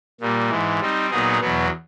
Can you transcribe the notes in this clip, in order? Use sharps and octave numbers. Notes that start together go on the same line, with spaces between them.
A#2 G3 A#3
G#2 E3 G#3
G3 C4 D#4
A#2 F#3 B3 D#4 G#4
E2 B2 F#3 B3